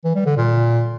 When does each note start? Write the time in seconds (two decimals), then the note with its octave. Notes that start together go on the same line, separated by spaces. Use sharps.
0.04 E3
0.15 G3
0.26 D3
0.37 A#2